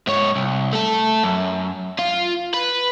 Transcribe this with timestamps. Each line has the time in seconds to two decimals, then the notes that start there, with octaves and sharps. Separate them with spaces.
0.07 G#2 C#5
0.36 C2
0.73 A3 A4
1.23 F#2
1.99 F4
2.54 B4